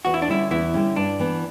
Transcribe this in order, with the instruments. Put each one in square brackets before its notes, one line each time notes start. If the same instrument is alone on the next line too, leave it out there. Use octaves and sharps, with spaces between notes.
[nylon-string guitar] E2 [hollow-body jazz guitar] F#4
[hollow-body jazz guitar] E4
D4
[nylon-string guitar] D3 G3 C#4 [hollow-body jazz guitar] E4
[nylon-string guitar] E2 [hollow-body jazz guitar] E4
[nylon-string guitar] D3 G3 C#4
[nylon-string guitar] G2 [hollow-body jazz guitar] D4
[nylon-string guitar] E3 B3